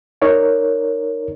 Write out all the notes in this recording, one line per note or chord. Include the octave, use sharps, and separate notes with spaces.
D#4 A#4 C#5 D5